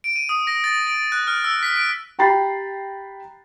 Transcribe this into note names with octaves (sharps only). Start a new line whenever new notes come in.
D7
D#7
D#6
A#6
A6
D7
F#6
F6
E6
B6
D7
G4 G5 A#5 B5 A6 C7